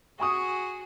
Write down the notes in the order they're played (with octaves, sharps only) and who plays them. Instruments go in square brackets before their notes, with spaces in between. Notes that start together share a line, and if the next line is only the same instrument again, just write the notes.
[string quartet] F#4 G#4 [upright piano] G#5 C#6 D#6